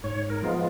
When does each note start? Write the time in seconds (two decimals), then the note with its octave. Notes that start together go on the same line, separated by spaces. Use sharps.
0.04 G#2 C#5
0.30 A#4
0.42 F3 G#3 B3 F4